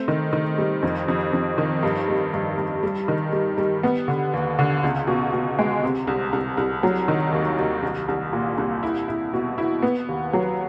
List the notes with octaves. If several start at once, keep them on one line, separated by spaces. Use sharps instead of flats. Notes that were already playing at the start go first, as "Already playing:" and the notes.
Already playing: A3 C4
D#3
D#3
G3
F2
F2
F2
D#3
G2
G3
G2
G2
G3
D#3
G3
G3
B3
D3
D#2
D3
C#2
B2
B2
G#3
C3
C2
C2
C2
F#3
D#3
D#2
D#2
C2
C2
A#2
C2
E4
E4
B2
E4
B3
D#2
F#3